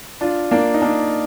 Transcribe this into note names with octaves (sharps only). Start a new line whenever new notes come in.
D4 F4
A#3 D4
D#4
A#3 D4